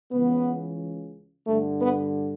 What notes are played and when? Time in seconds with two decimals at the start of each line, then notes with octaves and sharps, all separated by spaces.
0.11 C#2 C#3 E3 B3
1.47 G2 D3 A3
1.80 B3